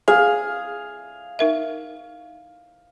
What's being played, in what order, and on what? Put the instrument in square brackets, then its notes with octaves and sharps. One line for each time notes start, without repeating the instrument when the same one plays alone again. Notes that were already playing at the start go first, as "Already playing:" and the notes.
[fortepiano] G#4 [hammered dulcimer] F5
[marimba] D#4 A#4 E5